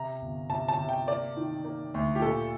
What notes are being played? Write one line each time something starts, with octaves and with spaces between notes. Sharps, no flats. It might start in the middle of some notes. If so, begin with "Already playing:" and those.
Already playing: C3 A#5
G1
C3 A5
A5
C3
G5
A#3 D5
D#3
A#3
D2
G4
A#2 A4